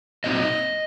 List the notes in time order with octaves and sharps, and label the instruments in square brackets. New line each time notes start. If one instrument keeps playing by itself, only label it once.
[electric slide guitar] A#2 F#3 C4 D#4 D#5